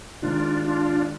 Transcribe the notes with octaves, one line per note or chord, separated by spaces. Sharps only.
G#2 D#3 G#3 D4 F4
D4 F4